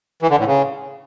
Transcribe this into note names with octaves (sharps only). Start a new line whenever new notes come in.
E3
D3
A2
C#3